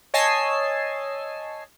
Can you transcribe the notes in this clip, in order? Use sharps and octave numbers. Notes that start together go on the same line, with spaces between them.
C#5 D#5 G#5 A5 E6 C7